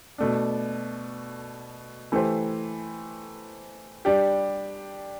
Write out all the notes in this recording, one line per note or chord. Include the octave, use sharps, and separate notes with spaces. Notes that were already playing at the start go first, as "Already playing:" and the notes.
B2 A3 D4
E3 A3 E4 G4 C5
G3 D4 G4